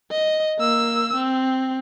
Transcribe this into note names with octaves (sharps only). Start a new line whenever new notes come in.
D#5
A#3 E6
C4